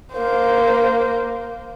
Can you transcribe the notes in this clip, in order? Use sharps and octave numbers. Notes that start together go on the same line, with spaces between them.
A#3 C5